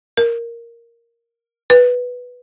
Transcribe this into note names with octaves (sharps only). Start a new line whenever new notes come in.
A#4
B4